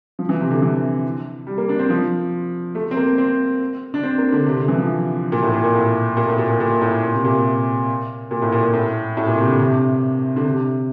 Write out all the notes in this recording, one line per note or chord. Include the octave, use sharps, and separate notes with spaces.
F3
E3
C3
D3
E3
G3
A#3
D4
C4
F3
A3
C4
A#3
C4
D4
C4
A#3
D3
C3
D3
E3
F3
A#2
A2
A#2
A#2
A2
A#2
A2
A#2
A#2
A#2
A2
A#2
C3
A#2
A#2
A2
A#2
A#2
A2
A2
A#2
C3
D3
C3
D3
C3